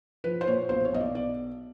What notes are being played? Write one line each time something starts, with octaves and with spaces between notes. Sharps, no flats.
F3 B4
C5
A#2 C#5
B1 C5
C#5
B1 D#5
D5
D5